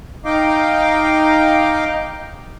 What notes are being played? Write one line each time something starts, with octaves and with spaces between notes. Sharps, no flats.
D#4 D#5 F5 G5 D6